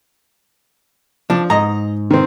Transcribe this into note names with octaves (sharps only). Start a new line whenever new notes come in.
F3 D4
G#2 D#5 A#5
D#3 C4